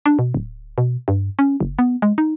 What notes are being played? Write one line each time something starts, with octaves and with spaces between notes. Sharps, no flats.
D4
B2
D1
B2
G2
C#4
F#1
B3
G#3
D#4